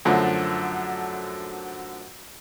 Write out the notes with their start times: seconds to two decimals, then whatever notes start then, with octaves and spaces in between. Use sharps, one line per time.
0.05 F#2 D3 F3 A3